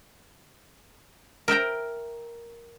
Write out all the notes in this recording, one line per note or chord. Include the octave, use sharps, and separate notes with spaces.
A#4 E5 G5 A#5